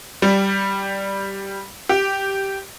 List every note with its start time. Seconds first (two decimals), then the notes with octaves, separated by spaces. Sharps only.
0.22 G3
1.89 G4